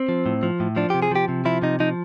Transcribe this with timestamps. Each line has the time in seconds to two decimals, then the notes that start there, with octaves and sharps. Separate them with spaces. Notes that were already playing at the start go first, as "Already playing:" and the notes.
Already playing: C4
0.09 F3
0.26 A2
0.43 F3
0.60 A2
0.76 F3 D4
0.90 G4
0.94 C3
1.02 G#4
1.12 F3 G4
1.29 C3
1.45 F3 E4
1.62 C3 D#4
1.80 F3 D#4